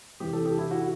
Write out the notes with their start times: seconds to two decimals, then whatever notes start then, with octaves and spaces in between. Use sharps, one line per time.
0.20 E2 C3 E3 G4
0.33 A4
0.46 G4
0.58 E4
0.71 F#4